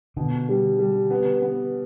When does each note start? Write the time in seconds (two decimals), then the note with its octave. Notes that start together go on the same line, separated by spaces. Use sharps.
0.17 B2 D3
0.49 G3
0.79 G3
1.10 B3
1.42 B3